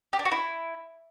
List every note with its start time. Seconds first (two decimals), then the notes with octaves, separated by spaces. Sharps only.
0.13 G4
0.19 D4
0.25 F#4
0.31 E4